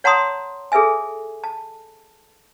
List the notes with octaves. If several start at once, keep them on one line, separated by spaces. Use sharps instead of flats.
C#5 F#5 A5 A#5 C6 D#6
G#4 A4 B4 E5 G#5
A5